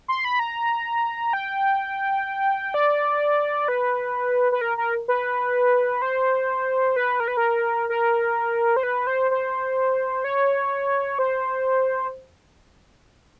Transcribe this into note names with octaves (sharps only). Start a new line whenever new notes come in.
C6
B5
A#5
G5
D5
B4
B4
A#4
A#4
B4
C5
B4
A#4
B4
A#4
A#4
C5
B4
C5
C5
C#5
C5